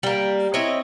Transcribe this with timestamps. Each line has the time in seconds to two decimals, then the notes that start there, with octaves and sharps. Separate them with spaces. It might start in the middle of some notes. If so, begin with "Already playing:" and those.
0.03 G3 A#3
0.54 C4 E4 C#5 D#5